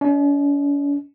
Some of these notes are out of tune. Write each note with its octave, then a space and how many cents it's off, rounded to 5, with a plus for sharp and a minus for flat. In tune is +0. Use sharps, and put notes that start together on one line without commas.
C#4 +45 D#5 +10